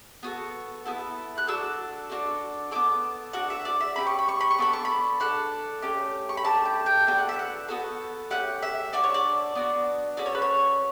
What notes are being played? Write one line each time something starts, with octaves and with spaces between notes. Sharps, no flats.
B3 F#4 A4
B3 E4 A4
F#6
D4 F#4 A4 E6
D4 F#4 A4
B3 E4 A4 D6
D4 F#4 A4 F#5
E5
D5
E5
C#4 E4 G4 B5
C#6
B5
C#6
B5
C#6
B3 D4 A4 B5
C#6
B5
D4 A4 F#5
A3 C#4 G4
C#6
B5
A3 D4 G4 A5
G5
G5
B3 D4 F#4 A4 G5
F#5
E5
F#5
B3 F#4 A4
A3 C#4 G4 F#5
E5
D4 F#4 A4 D5
C#5
D5
B3 D4 F#4
C#4 F#4 A4 D5
C#5
B4
C#5